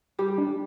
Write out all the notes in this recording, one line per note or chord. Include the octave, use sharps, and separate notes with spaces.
G3 G4
D4